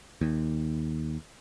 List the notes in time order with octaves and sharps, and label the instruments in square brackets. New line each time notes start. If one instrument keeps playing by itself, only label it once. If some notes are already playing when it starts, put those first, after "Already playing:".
[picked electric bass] D#2